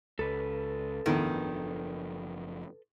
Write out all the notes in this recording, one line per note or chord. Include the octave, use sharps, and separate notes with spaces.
C#2 A4 B4
F#1 E2 A2 D#3 F3 D4 E4